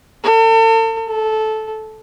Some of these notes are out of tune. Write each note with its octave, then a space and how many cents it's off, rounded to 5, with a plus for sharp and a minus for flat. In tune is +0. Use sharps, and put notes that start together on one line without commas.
A4 +40
A4 -15